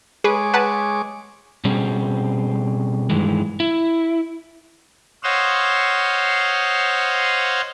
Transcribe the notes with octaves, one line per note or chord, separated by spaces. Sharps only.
G#3 G#4 B4 C#5 D6
B4 F#5 A5
B2 G3 C4 C#4 G#4
G2 D#3 E3 G#3
E4
C5 C#5 D#5 F5 F#5 E6